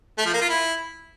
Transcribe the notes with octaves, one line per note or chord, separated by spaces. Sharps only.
A3
F3
A#3
F4
E4